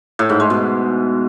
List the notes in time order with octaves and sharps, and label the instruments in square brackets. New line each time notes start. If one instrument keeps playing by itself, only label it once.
[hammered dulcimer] A2
G#2
G#3
B2